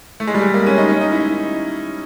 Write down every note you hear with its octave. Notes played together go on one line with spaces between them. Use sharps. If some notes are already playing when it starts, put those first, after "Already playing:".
A3
G#3
G3
G#3
A#3
C#4
D#4
C#4
D#4
E4